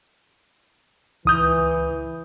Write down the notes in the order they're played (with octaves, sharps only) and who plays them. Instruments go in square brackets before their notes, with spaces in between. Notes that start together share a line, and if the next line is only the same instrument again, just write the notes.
[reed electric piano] C#2 D#6 G6 [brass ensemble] E3